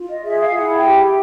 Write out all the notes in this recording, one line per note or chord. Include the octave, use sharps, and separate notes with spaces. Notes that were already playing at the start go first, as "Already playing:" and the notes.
Already playing: F4
D#5
G#4 E5
F5
E4 F#5
G5
G4